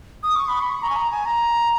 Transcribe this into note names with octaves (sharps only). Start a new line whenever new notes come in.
D#6
C#6
B5
C#6
A#5
G#5
A#5
G#5
A#5